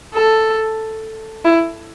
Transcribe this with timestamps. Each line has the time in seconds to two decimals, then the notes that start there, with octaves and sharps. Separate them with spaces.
0.14 A4
1.44 E4